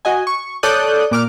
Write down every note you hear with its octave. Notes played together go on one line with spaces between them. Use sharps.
F#4 D#5 G#5
C#6
A4 C#5 D5 D#6 F#6 G6
A#2 D6 F6